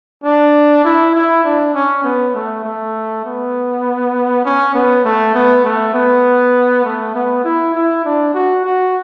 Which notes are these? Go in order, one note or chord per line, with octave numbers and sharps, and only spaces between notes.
D4
E4
E4
D4
C#4
B3
A3
A3
B3
C#4
B3
A3
B3
A3
B3
A3
B3
E4
E4
D4
F#4
F#4